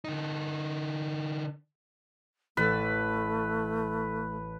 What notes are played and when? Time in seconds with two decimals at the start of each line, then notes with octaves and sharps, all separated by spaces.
0.04 D3 D#4
2.57 A1 A3 A4 B4